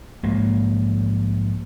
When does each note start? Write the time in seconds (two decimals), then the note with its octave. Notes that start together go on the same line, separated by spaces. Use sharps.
0.23 A#1 G#2 A#3